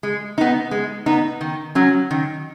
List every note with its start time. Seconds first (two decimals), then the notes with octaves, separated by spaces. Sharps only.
0.03 G#3
0.38 B3 D#4
0.71 G#3
1.06 B3 D#4
1.41 D#3
1.75 F#3 C#4
2.11 D#3